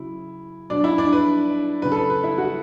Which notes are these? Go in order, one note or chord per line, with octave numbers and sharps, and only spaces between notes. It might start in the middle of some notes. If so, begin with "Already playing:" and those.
Already playing: C#3 F#3 E4
B2 F#3 D4 D5
E4 E5
D4 D5
B4
C#3 F#3 B4
A4
B4
B4
E4 E5
F#4 F#5